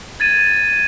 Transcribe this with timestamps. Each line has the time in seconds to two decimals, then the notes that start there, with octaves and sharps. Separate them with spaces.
0.20 G#6 A6 D#7